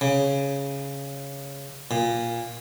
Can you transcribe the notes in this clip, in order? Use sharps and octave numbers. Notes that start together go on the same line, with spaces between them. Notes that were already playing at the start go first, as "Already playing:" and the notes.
C#3
A#2